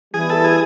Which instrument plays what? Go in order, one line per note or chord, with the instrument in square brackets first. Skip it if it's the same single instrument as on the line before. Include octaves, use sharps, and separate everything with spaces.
[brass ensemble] E3 G3 B3 E4 [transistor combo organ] G#4
[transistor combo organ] A4
G#4